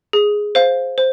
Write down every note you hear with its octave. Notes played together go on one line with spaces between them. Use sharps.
G#4
C5 F5
C5